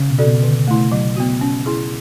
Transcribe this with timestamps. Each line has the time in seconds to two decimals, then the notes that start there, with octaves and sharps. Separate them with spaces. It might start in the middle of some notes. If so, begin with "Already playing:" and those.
Already playing: C#3
0.11 B2
0.19 F#4 A4 D5
0.27 B2
0.43 D3
0.68 A3 E4
0.92 F#3
1.17 B3 F#4
1.41 C#4
1.66 E4 G#4